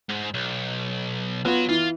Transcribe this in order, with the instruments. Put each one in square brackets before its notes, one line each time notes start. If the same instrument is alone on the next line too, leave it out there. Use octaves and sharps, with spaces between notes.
[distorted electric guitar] G#2
B1
[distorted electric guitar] F#3 F#4 [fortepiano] B3 F4
[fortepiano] E3 [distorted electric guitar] F4